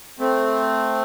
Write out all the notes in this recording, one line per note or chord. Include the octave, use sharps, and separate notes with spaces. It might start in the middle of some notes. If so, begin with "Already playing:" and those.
A3 C4